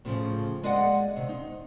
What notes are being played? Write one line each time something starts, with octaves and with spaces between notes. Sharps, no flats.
A2 C#3 F3
G#3 D5 D#5 F5 F#5
C3 D#3
D#4